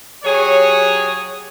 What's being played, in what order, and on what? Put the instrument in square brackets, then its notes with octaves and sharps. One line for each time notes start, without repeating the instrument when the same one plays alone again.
[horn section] F#3 G4 G#4 C#5